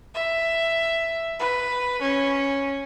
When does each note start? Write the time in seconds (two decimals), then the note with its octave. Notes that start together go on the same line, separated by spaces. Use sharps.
0.14 E5
1.39 B4
2.01 C#4